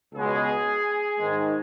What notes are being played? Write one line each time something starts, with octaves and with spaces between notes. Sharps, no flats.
C#2 B2 G#3 G#4
G#2 D#3 G#3